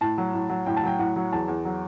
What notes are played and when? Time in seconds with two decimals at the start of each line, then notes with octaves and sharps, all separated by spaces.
0.01 A2 A5
0.18 F#3
0.34 A2
0.50 F#3
0.66 A2 G5
0.77 A5
0.83 F#3 G5
0.99 A2 F#5
1.16 F#3
1.32 E2 A5
1.48 E2
1.65 F#3